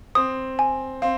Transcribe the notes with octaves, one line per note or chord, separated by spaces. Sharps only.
C4 D#6
G#5
C4 F5